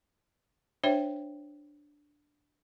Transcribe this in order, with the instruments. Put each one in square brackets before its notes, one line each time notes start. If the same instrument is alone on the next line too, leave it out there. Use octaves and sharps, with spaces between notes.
[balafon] D4 C5 C#5 E5 G5